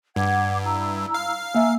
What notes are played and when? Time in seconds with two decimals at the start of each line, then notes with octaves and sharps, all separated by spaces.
0.16 G2 F#5 D6 G#6
0.65 E4 A#5 E6
1.14 F5
1.55 A#3 E5 G#5 A#5 E6